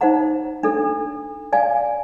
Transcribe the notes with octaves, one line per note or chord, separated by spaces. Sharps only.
D#4 C5 D#5 F#5 A#5
D4 A4
D5 F5 G#5